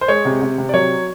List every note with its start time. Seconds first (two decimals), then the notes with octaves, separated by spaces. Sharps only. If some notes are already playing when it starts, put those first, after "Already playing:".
0.01 C5
0.08 G#3 C#5
0.25 C3
0.42 C3
0.58 C3
0.69 D5
0.74 F#3 C#5